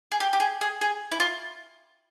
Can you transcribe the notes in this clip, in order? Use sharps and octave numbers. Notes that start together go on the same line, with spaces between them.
G#4
G4
G4
G#4
G#4
G#4
E4
F4